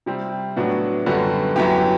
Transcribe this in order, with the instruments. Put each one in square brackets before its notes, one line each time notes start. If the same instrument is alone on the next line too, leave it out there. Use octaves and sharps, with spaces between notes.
[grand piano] C3 G3 C4
A2 F#3 B3 D4 F#4
F#2 D3 G3 B3 F#4
F#2 F#3 B3 E4 G4